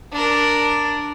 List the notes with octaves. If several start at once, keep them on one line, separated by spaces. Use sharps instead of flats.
D4 A#4